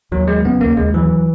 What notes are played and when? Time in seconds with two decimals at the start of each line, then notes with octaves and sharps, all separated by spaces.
0.12 D#2 F#3
0.28 F#3 G#3
0.45 C#3 B3
0.61 D#2 A#3
0.77 D#2 G#3
0.94 E3 F#3